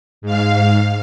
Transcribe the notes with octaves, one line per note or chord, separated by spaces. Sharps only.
G#2 F5